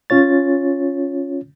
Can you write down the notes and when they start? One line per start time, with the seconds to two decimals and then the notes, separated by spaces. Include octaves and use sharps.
0.10 C#4 F4 C#5 A6